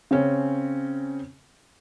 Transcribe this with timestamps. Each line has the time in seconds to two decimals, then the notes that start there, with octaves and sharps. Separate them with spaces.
0.11 C#3 C4 C#4